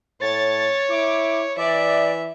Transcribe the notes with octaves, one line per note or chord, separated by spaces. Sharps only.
A2 C#5 A6
E4 D6
E3 D5 E5